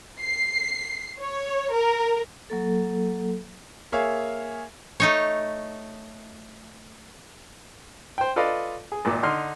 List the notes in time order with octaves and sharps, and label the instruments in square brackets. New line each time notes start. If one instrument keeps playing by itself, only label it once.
[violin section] C7
C#5
A#4
[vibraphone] F#3 A#3 A4
[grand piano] A#3 G#4 C#5 E5 F5
[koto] A3 D#4 C#5
[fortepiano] C5 G5
F4 A4 B4 D5 D#5 F5
G#4
G#1 A#2 D6
D3 D#4 C6 F6